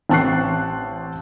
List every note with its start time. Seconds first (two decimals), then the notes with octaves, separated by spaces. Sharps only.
0.10 A1 C4 A5 C#6 F#6 C7